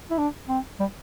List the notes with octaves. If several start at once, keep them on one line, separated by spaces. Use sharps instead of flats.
E4
D4
C4
G3